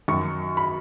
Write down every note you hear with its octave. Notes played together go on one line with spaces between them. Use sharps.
F#2 D#3 F#3 C#6
B5